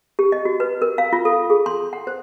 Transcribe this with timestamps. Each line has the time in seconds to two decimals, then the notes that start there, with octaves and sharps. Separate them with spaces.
0.19 G4
0.32 D#5
0.45 F#4
0.60 B4
0.82 A#4
0.98 F5
1.13 F4
1.25 A4
1.50 G#4
1.66 C6
1.93 F#5
2.07 C5